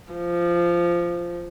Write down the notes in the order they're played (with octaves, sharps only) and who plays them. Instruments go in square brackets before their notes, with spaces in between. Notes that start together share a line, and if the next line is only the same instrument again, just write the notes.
[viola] F3